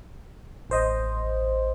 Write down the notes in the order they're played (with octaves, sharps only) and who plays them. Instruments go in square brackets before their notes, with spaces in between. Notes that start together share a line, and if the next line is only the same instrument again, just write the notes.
[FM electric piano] A1 C5 D#5